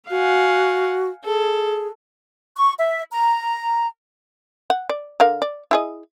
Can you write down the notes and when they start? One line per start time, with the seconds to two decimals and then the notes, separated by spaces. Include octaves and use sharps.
0.10 F#4 F5 F#5 G#5
1.25 G#4 A4
2.57 C#6
2.78 E5
3.12 A#5
4.70 F#5
4.89 D5
5.20 D3 A#4 F5
5.42 D5
5.71 E4 G#4 D#5